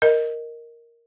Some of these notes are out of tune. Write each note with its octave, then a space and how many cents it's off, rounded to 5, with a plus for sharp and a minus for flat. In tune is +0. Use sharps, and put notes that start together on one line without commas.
A#4 +0 D#5 +0